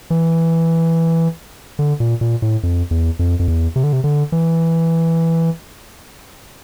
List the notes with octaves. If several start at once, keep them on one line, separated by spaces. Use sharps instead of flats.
E3
D3
A#2
A#2
A2
F2
E2
F2
F2
E2
C3
D3
C3
D3
E3